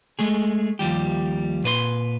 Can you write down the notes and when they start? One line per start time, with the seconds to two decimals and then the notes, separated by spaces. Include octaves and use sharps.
0.19 G#3 A3 G#4
0.79 D#2 F3 G3 G4
1.64 A#2 B4 C5 C6